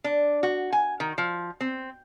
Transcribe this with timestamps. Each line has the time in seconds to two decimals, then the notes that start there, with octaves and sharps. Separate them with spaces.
0.04 D4
0.43 F#4
0.73 G#5
1.00 D#3
1.18 F3
1.61 C4